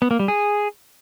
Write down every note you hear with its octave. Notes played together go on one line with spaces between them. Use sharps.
B3
A#3
G3
G#4